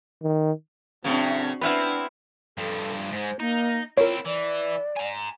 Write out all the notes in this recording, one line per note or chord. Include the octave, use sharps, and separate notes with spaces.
D#3
A2 C#3 F#3 C4 D4
B3 C4 D4 E4 B4 E5 F6
G2 F3 A4
G#2 G#3 C5
A#3 D#4
C4 E4 F4 A#4 C#5
E3 D5
G#5 A#5